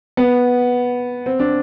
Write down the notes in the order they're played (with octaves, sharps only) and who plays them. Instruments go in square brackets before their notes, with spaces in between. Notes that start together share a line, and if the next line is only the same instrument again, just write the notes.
[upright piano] B3
C4
D4